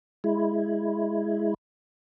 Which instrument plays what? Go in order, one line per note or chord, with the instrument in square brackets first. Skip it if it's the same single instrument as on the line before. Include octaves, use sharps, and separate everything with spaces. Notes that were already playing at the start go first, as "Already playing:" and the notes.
[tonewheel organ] G#3 E4